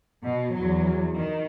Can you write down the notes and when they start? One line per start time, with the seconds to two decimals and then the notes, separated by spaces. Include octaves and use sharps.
0.23 B2
0.54 E2 F#3
1.15 D#3